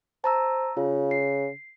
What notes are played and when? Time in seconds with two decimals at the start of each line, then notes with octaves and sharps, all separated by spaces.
0.24 C5 A5 A#5 E6
0.77 C#3 F4
1.11 C7